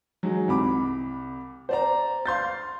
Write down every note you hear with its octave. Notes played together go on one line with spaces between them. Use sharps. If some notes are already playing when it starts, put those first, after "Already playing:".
F#3 G#3 D#4
C2 B5 D6
C5 D5 A#5
F5 C6 G6 A6